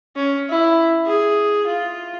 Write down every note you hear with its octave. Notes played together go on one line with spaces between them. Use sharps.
C#4
E4
G#4
F4